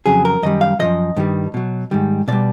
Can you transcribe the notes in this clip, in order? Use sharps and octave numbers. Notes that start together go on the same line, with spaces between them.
F2 C#3 F#3 G#4
A#4
F#2 D#3 G3 D#5
F5
C#3 F3 D#5
F#2
G2 D#3 G3
B2 F#3
G#2 D#3 G3
B2 G3 D5